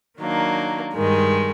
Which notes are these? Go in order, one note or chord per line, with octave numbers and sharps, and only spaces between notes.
D#3 F#3 A#3 D4
G2 D#3 G#3